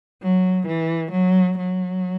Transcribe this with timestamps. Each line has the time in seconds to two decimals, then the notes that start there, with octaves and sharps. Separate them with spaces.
0.22 F#3
0.67 E3
1.13 F#3
1.58 F#3